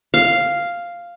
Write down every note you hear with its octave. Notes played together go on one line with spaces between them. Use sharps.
F5